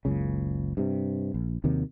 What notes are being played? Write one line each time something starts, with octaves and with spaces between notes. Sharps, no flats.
F#1 C#2 C#3
G2 C3
A#1
D#2 C3 D#3 F#3